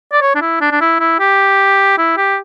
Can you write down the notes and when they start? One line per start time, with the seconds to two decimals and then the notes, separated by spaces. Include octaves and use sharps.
0.12 D5
0.21 C#5
0.35 D4
0.41 E4
0.61 D4
0.71 D4
0.81 E4
1.00 E4
1.19 G4
1.98 E4
2.17 G4